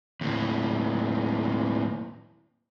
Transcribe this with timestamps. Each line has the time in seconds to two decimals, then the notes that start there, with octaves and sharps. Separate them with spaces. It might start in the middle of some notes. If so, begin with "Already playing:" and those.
0.21 D#2 A2